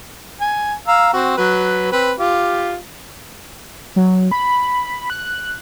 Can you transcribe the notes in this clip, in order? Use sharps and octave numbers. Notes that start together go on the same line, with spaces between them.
G#5
F5 A#5 E6
C4 F#4
F#3 B4
C4 B4
F4 G4
F#3
B5
F#6